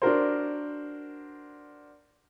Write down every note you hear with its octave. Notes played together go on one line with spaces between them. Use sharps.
D4 F#4 A#4 C5